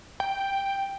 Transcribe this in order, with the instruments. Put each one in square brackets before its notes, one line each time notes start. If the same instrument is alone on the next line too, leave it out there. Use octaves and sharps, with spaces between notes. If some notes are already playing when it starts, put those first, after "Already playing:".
[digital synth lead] G5